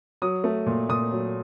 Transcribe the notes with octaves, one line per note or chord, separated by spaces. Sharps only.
F#3 D#6
A3
A#2
A#2 D#6
F#3